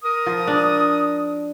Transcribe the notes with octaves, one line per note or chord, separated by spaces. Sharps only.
A#4 D#6
F3
D4